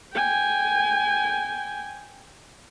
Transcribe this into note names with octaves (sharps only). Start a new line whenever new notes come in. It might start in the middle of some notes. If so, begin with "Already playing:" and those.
G5 G#5